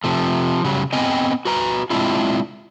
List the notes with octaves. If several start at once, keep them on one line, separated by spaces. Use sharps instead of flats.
C3 F3 A3
C#3 F#3 G3
B3 C4 D#5 G5 G#5
F#4 B4 A#5
G#3 B3 C4 D4 E4 F4